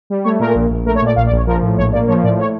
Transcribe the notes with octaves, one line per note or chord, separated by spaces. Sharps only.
G3
A3 C#5
A#2 A#4
A#1
A#1
A3 A#4
C#5
A#2 D5
A#1 F5
D5
A#1 C#5
F3 A#4
A2
A#1 C#5
A#3 D5
F3 C#5
A2 D5
C#5